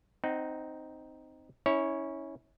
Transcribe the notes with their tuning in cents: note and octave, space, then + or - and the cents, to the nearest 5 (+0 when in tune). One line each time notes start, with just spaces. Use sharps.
C4 +0 D#4 +0 F#5 +30
C#4 +0 E4 -30 C#5 +0